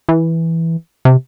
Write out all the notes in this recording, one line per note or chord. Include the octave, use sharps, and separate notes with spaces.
E3
C3